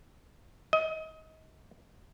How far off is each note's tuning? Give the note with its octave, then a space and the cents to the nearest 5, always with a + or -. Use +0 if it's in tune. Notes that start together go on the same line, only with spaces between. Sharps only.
D#5 +30